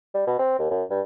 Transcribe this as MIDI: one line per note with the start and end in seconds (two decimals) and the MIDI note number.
0.14 0.25 55
0.27 0.34 47
0.39 0.58 60
0.59 0.70 39
0.71 0.83 42
0.90 1.01 43